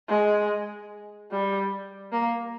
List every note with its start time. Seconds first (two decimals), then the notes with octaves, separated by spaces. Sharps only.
0.08 G#3
1.31 G3
2.12 A#3